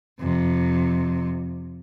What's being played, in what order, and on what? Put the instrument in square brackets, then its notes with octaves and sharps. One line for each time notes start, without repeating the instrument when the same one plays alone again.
[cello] F2 C3